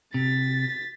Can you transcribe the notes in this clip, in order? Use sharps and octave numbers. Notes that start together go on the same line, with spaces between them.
C3 A6 B6